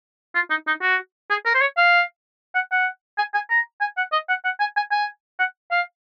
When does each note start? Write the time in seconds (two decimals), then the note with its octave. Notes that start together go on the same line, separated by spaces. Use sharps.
0.35 F4
0.50 D#4
0.67 D#4
0.82 F#4
1.30 G#4
1.45 A#4
1.54 C5
1.61 C#5
1.77 F5
2.55 F#5
2.72 F#5
3.18 G#5
3.34 G#5
3.50 A#5
3.81 G#5
3.97 F#5
4.12 D#5
4.29 F#5
4.45 F#5
4.60 G#5
4.76 G#5
4.91 G#5
5.39 F#5
5.71 F5